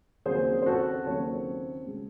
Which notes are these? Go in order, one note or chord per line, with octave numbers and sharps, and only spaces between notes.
D#2 C#3 F#3 C4 G#4 C5
C5
F#4 A4
D#2 C#3 F#3 C4 A4 C#5
C#3 G#3